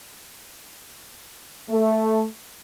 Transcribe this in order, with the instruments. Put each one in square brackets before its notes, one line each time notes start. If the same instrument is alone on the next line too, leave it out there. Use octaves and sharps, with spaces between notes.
[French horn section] A3